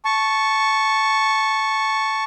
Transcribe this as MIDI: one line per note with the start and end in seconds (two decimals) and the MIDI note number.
0.05 2.24 81
0.05 2.24 85